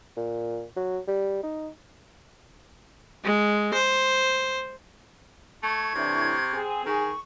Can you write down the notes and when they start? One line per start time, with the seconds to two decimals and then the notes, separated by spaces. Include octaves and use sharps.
0.16 A#2
0.76 F#3
1.08 G3
1.43 D#4
3.24 G#3
3.74 C5
5.63 A3 C#6 G#6
5.95 A2 C3 E3 D4
6.53 C4 G#4
6.86 D#3 G#4 C#6